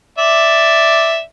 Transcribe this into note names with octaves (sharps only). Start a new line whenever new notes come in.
D5 E5